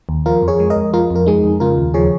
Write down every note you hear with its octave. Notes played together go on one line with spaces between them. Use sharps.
D#2
F3 F4 A#4
F2
G#4 C#5
G#3
A#4 D#5
F2
F3 F4 A#4
F2
A#4
G#3 D#4 G#4
F2
C#3 F4 A#4
D#2
F3 G#4 C#5